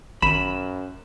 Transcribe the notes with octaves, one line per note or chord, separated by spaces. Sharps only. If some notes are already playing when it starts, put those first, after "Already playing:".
G#1 F#2 B5 D#7 E7